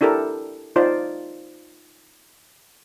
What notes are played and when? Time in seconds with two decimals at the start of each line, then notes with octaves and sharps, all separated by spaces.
0.01 D4 E4 G4 A4 A#4
0.76 D#4 F4 C5 D5